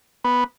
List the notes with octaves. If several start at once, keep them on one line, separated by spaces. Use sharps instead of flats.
B3